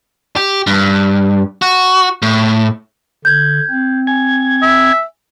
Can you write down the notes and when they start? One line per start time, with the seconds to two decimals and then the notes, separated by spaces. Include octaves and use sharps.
0.36 G4
0.67 G2
1.62 F#4
2.22 A2
3.25 D3 G6 G#6
3.70 C4
4.07 G#5 G#6
4.62 E5